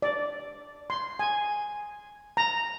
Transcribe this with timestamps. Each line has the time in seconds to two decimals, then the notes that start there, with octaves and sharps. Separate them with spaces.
0.02 D5
0.90 C6
1.19 G#5
2.37 A#5